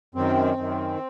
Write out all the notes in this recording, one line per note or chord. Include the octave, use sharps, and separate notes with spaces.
F#2 D#3 C4
F#2 D#3